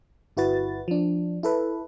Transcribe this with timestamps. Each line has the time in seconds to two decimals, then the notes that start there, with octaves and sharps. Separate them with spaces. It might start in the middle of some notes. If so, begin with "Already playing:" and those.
0.37 G1 E4 F#4 B4 A6
0.88 F3 D4
1.43 E4 A4 B4